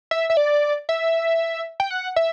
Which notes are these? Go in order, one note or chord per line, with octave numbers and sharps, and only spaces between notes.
E5
E5
D5
E5
G5
F#5
E5